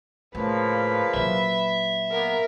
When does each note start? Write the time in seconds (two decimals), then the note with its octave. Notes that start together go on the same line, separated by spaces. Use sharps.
0.35 A2 C#3 F3 A#3 B4
1.14 A#2 F#3 E5
2.11 A#3 B3 A#4